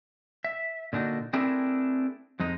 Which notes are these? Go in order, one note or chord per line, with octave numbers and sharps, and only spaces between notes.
E5
A#2 D3 D4 D#4 F#4
A3 C4 D4 E4 G#4 A#4
F2 G#3 D#4